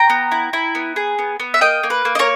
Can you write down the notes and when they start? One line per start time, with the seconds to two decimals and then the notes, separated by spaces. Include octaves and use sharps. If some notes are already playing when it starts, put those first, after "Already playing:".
Already playing: G5 A#5
0.10 B3
0.32 E4
0.53 E4
0.75 B3
0.96 G#4
1.19 B3
1.40 B3
1.54 E5
1.61 A#3 D#5 G5
1.83 A#3
1.90 B4
2.05 A#3
2.15 D#5
2.19 A#4 C#5